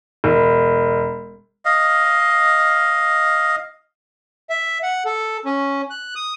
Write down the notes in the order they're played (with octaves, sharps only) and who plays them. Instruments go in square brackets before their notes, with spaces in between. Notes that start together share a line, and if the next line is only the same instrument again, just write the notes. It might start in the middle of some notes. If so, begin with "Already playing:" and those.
[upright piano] E1
[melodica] D#5 F5
[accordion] E5
F#5
A4
C#4
F#6
D#6